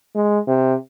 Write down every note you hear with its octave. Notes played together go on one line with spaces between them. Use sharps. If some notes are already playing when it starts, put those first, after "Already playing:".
G#3
C3